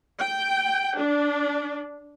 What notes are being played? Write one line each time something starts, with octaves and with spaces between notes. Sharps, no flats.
G5
D4